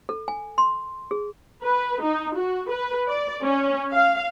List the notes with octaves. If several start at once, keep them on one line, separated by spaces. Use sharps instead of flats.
A4
G#5
C6
G#4
B4
D#4
F#4
B4
D5
C#4
F5